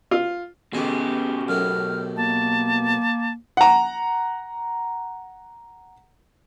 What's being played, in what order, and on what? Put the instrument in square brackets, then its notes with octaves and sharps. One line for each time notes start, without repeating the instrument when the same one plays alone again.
[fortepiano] F4
[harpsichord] A1 G#4 D#5 [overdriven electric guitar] B2 G4 [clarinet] C#4
[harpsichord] F#2 A2 D#4 [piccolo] F6
[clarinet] A#3 [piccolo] A5
[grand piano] F#5 A#5